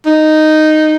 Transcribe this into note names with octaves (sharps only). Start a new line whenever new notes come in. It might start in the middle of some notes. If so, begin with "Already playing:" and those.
D#4